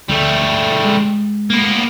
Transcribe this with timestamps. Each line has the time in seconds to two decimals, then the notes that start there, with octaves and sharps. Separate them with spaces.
0.09 D2 G3 A3
0.84 G#3
1.50 A#3 B3